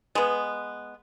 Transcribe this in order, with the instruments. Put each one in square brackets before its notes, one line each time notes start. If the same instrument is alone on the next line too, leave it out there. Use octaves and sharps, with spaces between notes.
[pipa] G#3 B3